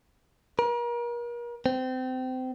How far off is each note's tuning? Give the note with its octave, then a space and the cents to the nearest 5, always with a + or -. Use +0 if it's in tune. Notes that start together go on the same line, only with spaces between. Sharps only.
A#4 +40
C4 -25